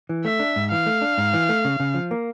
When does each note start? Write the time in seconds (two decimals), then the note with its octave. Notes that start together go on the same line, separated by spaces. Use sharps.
0.09 E3
0.25 A3 E5
0.39 D4
0.56 G#2
0.72 E3 F5
0.86 A3
1.01 D4
1.18 G#2
1.33 E3
1.49 A3
1.65 C#3
1.80 C#3
1.95 F3
2.11 A#3